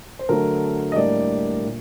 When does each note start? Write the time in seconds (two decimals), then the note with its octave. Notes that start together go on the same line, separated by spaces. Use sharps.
0.19 C5
0.29 D3 F#3 A3 A#4
0.92 D#5
0.96 A2 G3 A#3 D4 D5
1.63 A#2